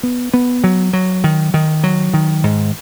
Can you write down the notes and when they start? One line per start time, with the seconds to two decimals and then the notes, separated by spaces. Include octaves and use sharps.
0.03 B3
0.34 B3
0.64 F#3
0.93 F#3
1.24 D#3
1.54 D#3
1.84 F#3
2.14 D#3
2.44 G#2